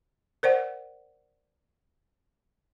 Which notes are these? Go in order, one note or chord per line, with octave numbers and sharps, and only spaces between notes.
A#4 C5 D5 F#5